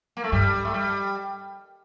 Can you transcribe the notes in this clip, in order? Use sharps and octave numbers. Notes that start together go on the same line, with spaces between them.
A#3
A3
G2 G3
A3
G3